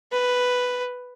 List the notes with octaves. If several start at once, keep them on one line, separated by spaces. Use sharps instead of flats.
B4